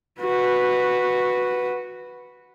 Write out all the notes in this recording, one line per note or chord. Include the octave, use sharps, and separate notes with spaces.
F#4 B4